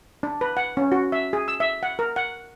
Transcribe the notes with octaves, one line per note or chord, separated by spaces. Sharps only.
D4
B4
F#5
C#4
F#4
E5
G#4
E6
E5
F#5
A#4
F#5